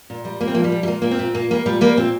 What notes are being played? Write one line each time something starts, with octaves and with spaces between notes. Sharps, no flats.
A#2
G3
A#2 A#3
C4
F3 A#3
G3
A#2
G3
A#2 A#3
A#2 A#3
C4
A#2
A#2 A#3
G3 A#3
A#2 G3
G3 A#3
A#2 C4